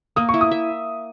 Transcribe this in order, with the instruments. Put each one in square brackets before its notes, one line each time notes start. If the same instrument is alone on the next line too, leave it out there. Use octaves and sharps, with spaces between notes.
[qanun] A#3 [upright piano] D#6
[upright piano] C#6
[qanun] E4
[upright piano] D#6
[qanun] E5